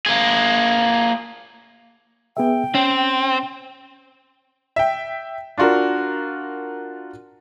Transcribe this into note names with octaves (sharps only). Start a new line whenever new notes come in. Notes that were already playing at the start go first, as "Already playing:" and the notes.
A#3 G#4
B3 G#4 E5 G5
C4 C#4
E5 G5
D4 F4 F#4 A#4